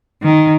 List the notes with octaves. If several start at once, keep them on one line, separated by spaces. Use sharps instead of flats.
D#3